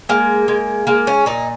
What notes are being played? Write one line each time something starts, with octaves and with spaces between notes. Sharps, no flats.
G#3 A#3
G#3
G#3 A#3
C#4
A#2 D#4